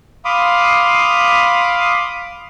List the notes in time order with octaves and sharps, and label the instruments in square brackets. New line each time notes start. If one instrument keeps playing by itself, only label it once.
[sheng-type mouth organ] F5 B5 C6 D6 D#6